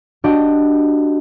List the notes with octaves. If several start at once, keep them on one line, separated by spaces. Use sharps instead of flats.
D4 F#4 G4 D#5 G5